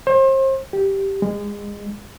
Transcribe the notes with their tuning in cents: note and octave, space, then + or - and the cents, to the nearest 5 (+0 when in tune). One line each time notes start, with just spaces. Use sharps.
C5 +35
G4 -5
G#3 -25